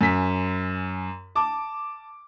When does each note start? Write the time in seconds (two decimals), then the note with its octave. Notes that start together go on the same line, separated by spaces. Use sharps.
0.01 F#2 G#5 B6
1.35 A5 D6